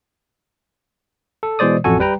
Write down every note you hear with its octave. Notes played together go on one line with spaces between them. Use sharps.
A4
B2 E3 G#3 C5 D5 D#6
A1 F2 F#4 A4 G#5
G3 B4 G5 A#5